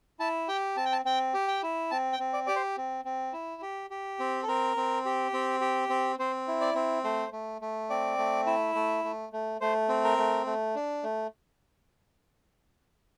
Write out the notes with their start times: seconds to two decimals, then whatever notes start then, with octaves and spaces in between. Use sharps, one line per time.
0.20 E4 A5
0.48 G4 G5
0.76 C4 A5
0.85 G5
0.92 A5
1.05 C4 G5
1.34 G4
1.48 G5
1.63 E4
1.91 C4 A5
2.12 G5
2.20 C4
2.33 D5
2.46 G4 D5
2.56 C5
2.77 C4
3.05 C4
3.33 E4
3.62 G4
3.90 G4
4.20 C4
4.43 A4
4.48 C4 A#4
4.77 C4
5.05 G4
5.34 C4
5.61 G4
5.90 C4
6.19 C4 C5
6.48 E4
6.61 D5
6.75 C4
7.04 A3 C5
7.32 A3
7.61 A3
7.90 C4 D5
8.18 A3
8.46 E4
8.75 A3
9.04 A3
9.33 A3
9.61 A3 C5
9.89 C4
10.04 A#4
10.18 A3
10.46 A3
10.75 D4
11.03 A3